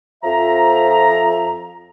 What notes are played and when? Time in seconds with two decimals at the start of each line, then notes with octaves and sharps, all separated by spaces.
0.24 F2 F3 E5 A#5